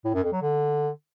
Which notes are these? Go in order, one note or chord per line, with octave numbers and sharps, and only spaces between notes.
A2
F#2
F2
F#3
D3